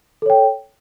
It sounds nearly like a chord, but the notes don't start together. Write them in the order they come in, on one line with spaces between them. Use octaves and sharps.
A4 C#5 G5